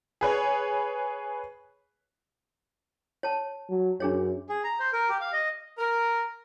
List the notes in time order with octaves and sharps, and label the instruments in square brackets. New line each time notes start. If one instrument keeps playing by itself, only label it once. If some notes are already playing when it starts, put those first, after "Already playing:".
[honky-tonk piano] G#4 B4 C#5
[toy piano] C#5 A5
[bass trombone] F#3
[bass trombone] F#2 [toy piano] D4 G#4 C#5
[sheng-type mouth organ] G#4
A#5
C5
A#4
G4
F5
D#5
[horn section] A#4